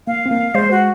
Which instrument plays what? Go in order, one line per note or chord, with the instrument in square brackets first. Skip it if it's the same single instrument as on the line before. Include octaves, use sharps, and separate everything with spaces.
[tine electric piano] A#3 [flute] F5
[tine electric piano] C4
A#3
[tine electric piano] G#3 [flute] C5
[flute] F#4